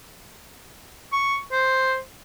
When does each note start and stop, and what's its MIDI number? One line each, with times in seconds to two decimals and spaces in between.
1.12 1.36 85
1.52 1.96 72